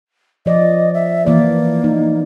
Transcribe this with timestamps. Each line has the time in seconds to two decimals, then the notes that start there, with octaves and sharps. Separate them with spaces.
0.46 F3 D5 D#5
0.94 E5
1.26 E3 A#3 D5
1.84 D#4